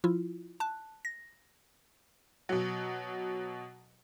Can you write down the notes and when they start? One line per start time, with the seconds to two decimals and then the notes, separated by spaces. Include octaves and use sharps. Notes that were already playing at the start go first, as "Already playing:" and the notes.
0.04 F3 E4 F4
0.60 A5 F#6
1.05 A#6
2.49 B2 F#3